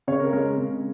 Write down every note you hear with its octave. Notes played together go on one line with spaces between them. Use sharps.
C#3 C#5
A#4
G#3 A#4
C#3